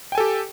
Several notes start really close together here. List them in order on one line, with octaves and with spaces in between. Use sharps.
G5 G#5 A4 G4